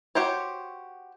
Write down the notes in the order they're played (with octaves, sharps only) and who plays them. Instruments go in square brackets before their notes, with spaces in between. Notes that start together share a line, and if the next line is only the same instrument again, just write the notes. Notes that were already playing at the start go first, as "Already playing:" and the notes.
[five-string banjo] F#4 G4 C5 C#5